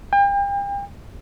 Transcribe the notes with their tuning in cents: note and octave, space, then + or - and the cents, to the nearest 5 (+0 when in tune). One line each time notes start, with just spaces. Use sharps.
G5 +40